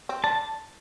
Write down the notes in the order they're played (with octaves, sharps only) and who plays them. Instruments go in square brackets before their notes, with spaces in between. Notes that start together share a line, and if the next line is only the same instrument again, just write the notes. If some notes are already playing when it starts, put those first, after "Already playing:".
[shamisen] C4
[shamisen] D4 [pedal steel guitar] A5